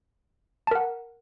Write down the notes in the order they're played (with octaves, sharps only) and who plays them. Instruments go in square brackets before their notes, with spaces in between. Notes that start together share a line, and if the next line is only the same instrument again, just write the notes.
[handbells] A5
A#4
F#5